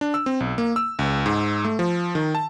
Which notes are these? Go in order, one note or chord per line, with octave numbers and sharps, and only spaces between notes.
D4
E6
C4
B1
A#3
E6
C#2
G#2
A3
F3
D#3
A5